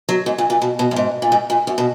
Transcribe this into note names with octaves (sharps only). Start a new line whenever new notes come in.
F#3
G#2
A#2
A#2
B2
B2
F#2
G#2
A#2
G#2
A#2
F#2
B2